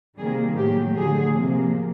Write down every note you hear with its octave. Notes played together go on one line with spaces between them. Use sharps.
C3 D#3 G3 A#3 G#4
A2 F#3 A3 G4
D3 F#3 A3 G#4
C3 F3 A#3